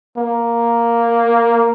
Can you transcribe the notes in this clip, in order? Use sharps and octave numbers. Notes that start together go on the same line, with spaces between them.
A#3